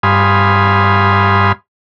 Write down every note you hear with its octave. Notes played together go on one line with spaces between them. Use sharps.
G2 F5 G#5 B5 C6 D#6